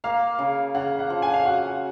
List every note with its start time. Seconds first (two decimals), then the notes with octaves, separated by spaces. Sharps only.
0.04 A#3 F5
0.39 C#3
0.75 C#3 F#5
0.99 F#5
1.10 F3
1.22 G#5
1.34 F5
1.45 F#4 F#5